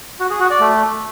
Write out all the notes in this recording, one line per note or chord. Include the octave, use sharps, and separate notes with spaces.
F#4
G#4
F#4
D5
A3